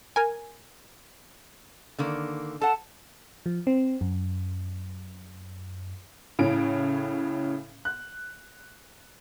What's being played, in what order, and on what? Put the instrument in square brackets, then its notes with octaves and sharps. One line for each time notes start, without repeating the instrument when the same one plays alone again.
[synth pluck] A#4 G#5
[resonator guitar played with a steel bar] D3 D#3 A#3
[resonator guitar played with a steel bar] A4 F#5 [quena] A5
[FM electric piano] F3
C4
F#2
[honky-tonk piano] A2 C#3 C#4 D7
F#6